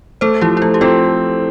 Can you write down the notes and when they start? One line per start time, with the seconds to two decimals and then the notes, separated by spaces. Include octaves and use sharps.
0.21 A3 A4 C5
0.41 F3 E4 G4
0.57 E4
0.62 A3 F4
0.74 G4
0.81 C4 F4 A4